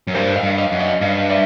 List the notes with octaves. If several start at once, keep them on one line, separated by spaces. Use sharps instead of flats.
F#2
G2 A#4 C5
D#5 F5
G2
D#5 F5
F#2
C#5 D#5
G2 D#5 F5
D5 E5